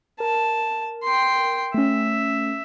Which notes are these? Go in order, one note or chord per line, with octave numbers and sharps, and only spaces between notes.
A#4 A5
G5 C6
A3 C#4 E5